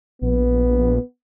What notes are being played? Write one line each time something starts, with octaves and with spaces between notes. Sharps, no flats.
A#1 B3